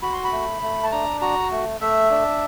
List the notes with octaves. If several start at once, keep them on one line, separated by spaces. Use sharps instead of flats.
F#4 B5
C6
B5
A3
A3
A5
D4 A#5
F#4 A#5
A3
A3 E5
D4